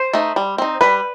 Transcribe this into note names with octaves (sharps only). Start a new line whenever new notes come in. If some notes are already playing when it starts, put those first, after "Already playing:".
Already playing: C5
A3 D#4
G3
C4 D#4
G3 B4